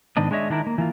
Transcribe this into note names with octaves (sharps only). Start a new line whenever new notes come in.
G#2 D#3 B3 D4 D#5
G#3 D4 E4 C#5 D#5 E5
D#3 D4 E4 A#4
A#3
E3 A#3 F4